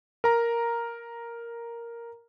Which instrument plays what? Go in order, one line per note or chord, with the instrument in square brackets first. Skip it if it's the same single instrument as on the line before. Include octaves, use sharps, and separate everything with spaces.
[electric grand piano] A#4 A#5